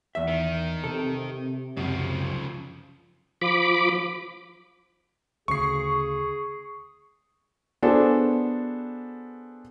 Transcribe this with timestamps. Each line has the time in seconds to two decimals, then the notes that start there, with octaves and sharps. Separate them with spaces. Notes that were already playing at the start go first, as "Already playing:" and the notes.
0.15 E2 E5
0.28 D#3
0.84 C3 A4
1.77 C#2 F#2 C#3 F3
3.41 F3 B5 D6
5.48 D2 C#3 G#4 C#6 C7
7.82 B3 D4 F#4 G#4 A4 C5